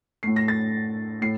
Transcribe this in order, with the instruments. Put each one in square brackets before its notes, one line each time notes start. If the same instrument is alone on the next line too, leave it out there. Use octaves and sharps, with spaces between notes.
[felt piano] A2 A3 C7
A#6
A6
A2 C7